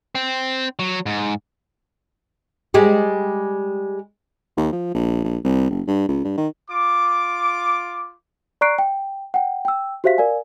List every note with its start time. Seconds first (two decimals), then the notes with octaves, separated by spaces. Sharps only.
0.15 C4
0.79 F#3
1.06 G#2
2.74 G3 G#3
4.57 D#2
4.72 F3
4.94 A#1
5.24 A#1
5.44 C2
5.70 F#1
5.87 G2
6.08 C#2
6.24 G2
6.37 D#3
6.70 F4 D6
8.61 D5 A#5 C#6 F#6 C7 D7
8.78 G5
9.34 F#5 G5
9.65 G5 E6
10.04 F#4 G4 C5 E5 F5 B6
10.18 A#4 D5 F5 G#5